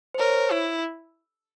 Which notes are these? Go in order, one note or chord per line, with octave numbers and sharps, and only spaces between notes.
C5
A#4 C#5
E4